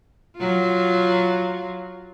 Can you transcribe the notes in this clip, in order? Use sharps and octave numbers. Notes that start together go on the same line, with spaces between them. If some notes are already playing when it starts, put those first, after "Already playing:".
F#3 F4